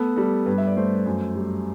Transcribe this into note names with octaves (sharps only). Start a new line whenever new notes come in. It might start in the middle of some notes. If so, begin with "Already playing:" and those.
Already playing: A3 B3 A4
G3 A4
G2 B4
E5
D5
A3 C5
F#2
G3